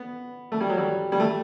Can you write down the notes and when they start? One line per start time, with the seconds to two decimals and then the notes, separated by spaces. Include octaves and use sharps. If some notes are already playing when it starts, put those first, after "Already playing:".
Already playing: B3
0.52 A3
0.61 G3
0.69 F#3
0.77 G3
1.12 G3
1.20 A3